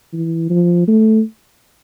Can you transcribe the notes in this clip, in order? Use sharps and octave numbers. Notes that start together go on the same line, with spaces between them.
E3
F3
A3